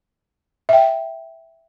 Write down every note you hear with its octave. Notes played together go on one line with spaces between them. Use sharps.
E5 G5